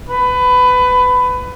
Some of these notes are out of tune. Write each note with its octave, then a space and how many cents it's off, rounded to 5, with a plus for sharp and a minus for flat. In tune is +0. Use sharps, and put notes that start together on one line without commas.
B4 +20